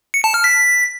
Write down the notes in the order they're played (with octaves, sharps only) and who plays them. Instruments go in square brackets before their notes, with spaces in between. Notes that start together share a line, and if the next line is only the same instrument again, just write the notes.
[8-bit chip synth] C#7
A5
F6
B6